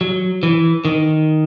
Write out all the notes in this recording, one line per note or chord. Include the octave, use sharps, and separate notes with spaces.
F#3
E3
D#3